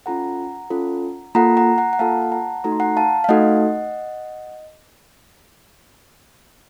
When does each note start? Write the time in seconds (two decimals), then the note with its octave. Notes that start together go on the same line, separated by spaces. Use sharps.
0.06 C#4 F4 A4 F#5 A#5
0.70 C#4 F4 A4
1.35 A#3 F4 A4 F#5 A#5
1.57 F#5 A#5
1.78 F#5 A#5
1.93 F#5
1.99 A#3 F4 A4 F5 A5
2.22 A5
2.32 F#5 A#5
2.64 A3 D#4 F#4 A4 A#5
2.72 C6
2.80 F#5 A#5
2.97 F5 A5
3.24 F5
3.29 A3 D#4 F#4 A4 D#5 F#5